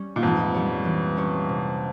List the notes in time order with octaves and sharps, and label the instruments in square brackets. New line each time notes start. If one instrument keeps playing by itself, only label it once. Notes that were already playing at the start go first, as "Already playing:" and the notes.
Already playing: [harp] G3 C#4
[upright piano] A#2
[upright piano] F2 G#2 [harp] E3
[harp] G3 C#4 G4 C#5
E3
G3 C#4 G4 C#5
C3